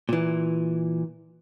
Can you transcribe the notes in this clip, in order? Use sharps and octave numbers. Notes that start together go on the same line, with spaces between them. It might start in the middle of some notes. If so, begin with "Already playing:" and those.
A#2 E3